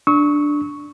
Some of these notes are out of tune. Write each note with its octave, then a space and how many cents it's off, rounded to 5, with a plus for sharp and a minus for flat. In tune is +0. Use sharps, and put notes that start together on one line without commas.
D4 +0 C#6 +0 E6 -40